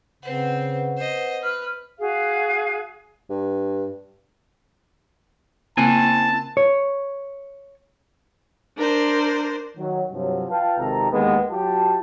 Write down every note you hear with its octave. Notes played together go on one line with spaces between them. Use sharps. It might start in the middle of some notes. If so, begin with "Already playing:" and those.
C#3 C4 B4 C5 F#5
C5 D#5
B4 F6
F#4 G#4 F5
G2
C#3 A#3 C4 E4 G#5 A5 F#6
C#5
D4 A#4 C5
D#3 F#3
G2 C3 F3 F#3
F4 B4 F5 G5 A5
G#1 C3 D#3 G4 A4 A#5
D#2 D3 G#3 B3
F#3 F4 G4 A5